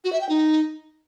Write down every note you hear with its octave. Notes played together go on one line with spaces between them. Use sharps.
F#4
E5
G5
D#4